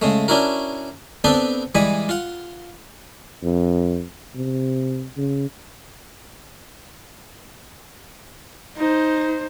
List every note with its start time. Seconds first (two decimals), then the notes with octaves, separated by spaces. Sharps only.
0.02 C#3 G#3 A3
0.28 C#4 D4 E4 F#4 A#4
1.24 B3 C4 D4 A4 B4 C5
1.75 E3 G3 G#3 G#5 B5
2.09 F4 F#5
3.43 F2
4.35 C3
5.17 C#3
8.77 D#4 C5